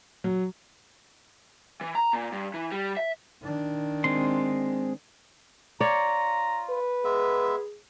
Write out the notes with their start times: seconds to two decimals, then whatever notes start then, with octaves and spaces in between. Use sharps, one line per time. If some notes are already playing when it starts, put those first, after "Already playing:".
0.24 F#3
1.81 E3
1.95 A#5
2.13 A#2
2.32 G2
2.54 E3
2.72 G3
2.97 E5
3.43 D#3 D4
4.04 G#3 C4 C6
5.81 F4 C#5 D5 A#5
6.70 B4
7.04 G#3 B3 G#4 E5